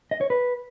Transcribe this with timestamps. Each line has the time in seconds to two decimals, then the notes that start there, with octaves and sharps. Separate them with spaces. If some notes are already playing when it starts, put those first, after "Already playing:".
0.11 D#5
0.21 C#5
0.30 B4